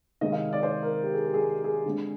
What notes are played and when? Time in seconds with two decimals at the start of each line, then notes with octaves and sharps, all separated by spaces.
0.21 C3 D#3 G#3 C4 D#5
0.32 F5
0.53 D5
0.63 C5
0.83 A#4
1.03 G4
1.14 G#4
1.24 G4
1.34 G#4
1.44 G4
1.64 G#4
1.85 D3 G#3 C4